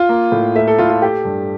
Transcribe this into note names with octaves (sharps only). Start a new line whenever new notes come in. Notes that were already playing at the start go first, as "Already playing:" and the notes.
Already playing: F4
A#3
A2
A3 E5
A4
A2 F4
F4
A3 G4
G2